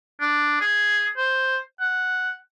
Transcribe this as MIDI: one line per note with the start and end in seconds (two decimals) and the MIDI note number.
0.21 0.56 62
0.61 1.07 68
1.17 1.58 72
1.80 2.34 78